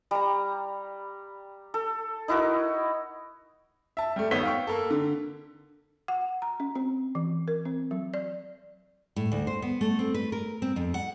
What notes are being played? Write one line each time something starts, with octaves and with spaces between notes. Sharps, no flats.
G3 A#5
A4
D#4 E4 F#4 A#4
E5 A5
G3 A3
G#1 B3 C#5 E6 B6 G7
F5 G5 C#6
A#3 A4
D3
F#5
A#5
C#4
C4
E3
A#4
C4
F#3
D5
A2
D2
C5
B3
A3
C4
B4
A#4
C4
F2
F#5